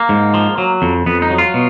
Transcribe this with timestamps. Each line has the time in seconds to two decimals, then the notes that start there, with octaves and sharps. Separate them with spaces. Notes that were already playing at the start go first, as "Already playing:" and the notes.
Already playing: A#3
0.09 G#2
0.34 F3
0.58 F#3
0.82 F2
1.06 F2 B3
1.22 D#4
1.30 F#3
1.38 F4
1.54 B2